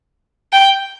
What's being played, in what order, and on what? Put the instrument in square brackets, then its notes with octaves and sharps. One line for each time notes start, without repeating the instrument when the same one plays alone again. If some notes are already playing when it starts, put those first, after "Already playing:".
[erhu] G5